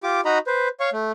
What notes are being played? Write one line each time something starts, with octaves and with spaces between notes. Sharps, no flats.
F4 G4 D6
D#4 F#4 D#5 A#5 B5
B4 C5
C#5 F5 C#6
A3